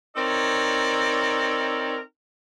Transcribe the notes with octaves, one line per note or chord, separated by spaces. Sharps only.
C4 D#4 A4 A#4 C#5 D5